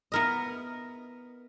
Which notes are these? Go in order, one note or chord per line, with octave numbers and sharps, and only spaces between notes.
B3 E4 A#4 D#5